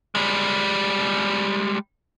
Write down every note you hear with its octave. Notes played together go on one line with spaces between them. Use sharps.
G3 G#3